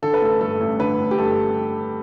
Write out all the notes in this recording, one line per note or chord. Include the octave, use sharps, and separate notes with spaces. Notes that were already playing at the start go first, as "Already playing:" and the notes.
D3 A4
B4
A1 A4
G2 A4
A1
D3 B4
A1
G4
G2 A4